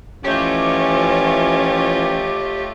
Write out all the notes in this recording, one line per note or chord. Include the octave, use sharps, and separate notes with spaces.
E3 F3 A3 C#4 F4 G4 C#5 D#5